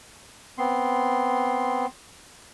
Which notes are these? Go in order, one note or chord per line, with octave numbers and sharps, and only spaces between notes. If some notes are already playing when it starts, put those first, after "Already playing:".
B3 C4 C6